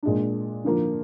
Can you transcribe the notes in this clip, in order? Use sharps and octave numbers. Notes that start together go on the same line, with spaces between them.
A#2 G#3 D4
D3 F3 A#3